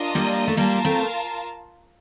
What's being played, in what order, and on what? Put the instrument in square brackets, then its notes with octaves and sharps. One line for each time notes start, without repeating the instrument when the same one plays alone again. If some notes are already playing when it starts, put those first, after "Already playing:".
Already playing: [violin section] D4 F4 A#4 D#5
[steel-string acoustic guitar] G3 A#3
A3
[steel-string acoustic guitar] G3 A#3 [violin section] F4 A#4 F5 A5
[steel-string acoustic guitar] A3 C4